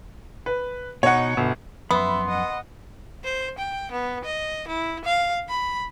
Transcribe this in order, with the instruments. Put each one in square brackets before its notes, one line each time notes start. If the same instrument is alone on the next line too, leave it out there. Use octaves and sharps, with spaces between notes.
[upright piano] B4
[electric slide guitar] B2 D#4 [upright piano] C#5 F#5
[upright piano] G1 [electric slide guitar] B2
[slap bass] F#2 F3 [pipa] B3 [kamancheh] E5 [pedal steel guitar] B5 C6
[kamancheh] D#5 F#5
C5
G5
B3
D#5
E4
F5
B5